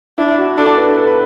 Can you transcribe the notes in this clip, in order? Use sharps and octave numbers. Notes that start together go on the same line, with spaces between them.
D4 E4
F#4
D4 A4
B4
A4
B4